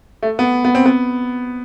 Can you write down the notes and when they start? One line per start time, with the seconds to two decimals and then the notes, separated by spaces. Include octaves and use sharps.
0.22 A3
0.39 B3
0.65 B3
0.75 C4
0.86 B3